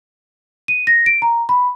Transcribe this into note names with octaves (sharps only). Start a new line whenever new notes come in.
D#7
A#6
D7
A#5
B5